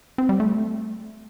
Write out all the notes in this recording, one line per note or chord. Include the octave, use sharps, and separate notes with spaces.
C4
G3
A3